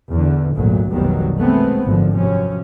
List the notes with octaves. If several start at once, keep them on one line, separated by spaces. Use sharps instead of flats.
E2 D3
G#1 D2 A#2 F#3
F1 B1 B2 D#3 F#3 G3
G#3 A3 B3 C4
G#1 F#2 D3 F3
F#2 C3 F3 C#4